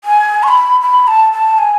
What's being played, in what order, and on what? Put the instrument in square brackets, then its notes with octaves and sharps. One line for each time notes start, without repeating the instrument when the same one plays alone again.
[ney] G#5
C#6
B5
B5
A5
A5
G#5